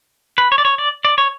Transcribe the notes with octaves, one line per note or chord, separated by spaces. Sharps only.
B4
C#5
D5
C#5
D5
D5
C#5